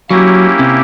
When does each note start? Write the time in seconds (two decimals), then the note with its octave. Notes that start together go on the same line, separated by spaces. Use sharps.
0.10 F#3 A#3 C#4 E4 G4
0.59 C3